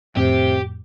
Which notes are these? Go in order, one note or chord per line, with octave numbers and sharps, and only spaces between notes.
F2 A2 C3 C4 G4